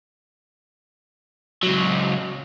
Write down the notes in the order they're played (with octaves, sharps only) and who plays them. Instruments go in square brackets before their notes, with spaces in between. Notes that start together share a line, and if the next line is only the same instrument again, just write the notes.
[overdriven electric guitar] C#2 F#3